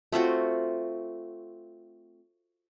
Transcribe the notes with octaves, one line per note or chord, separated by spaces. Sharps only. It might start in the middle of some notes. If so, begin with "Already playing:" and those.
A3 C4 F4 F#4